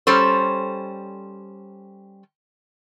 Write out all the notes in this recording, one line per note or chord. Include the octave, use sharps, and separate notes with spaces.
G3 C#4 A4 C5